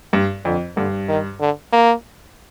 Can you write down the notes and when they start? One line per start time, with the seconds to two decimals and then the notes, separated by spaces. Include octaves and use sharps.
0.13 G2
0.45 F2 D3
0.77 G2 D3
1.08 D#3
1.40 D3
1.72 A#3